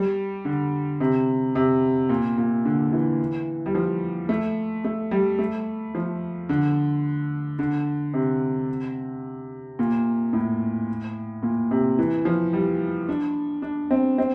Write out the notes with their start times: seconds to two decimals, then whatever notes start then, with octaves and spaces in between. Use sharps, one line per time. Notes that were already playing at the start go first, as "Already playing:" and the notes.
Already playing: G3
0.45 D3
1.00 C3
1.55 C3
2.09 A#2
2.38 A#2
2.65 D3
2.92 E3
3.66 G3
3.75 F3
4.29 A3
4.85 A3
5.11 G3
5.39 A3
5.95 F3
6.49 D3
7.59 D3
8.14 C3
9.79 A#2
10.33 A2
11.43 A#2
11.71 C3
11.99 E3
12.25 F3
12.53 G3
13.09 D4
13.62 D4
13.91 C4
14.18 C4